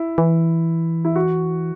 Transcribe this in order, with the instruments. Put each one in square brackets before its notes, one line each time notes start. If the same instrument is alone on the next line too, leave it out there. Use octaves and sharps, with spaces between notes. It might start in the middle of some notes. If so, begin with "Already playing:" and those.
Already playing: [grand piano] E4
[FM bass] E3
[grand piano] E4
F#4